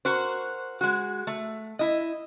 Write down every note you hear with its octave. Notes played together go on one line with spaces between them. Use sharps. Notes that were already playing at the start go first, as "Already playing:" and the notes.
F#4 A#4 C5
G#3 F#4
A3
E4 D#5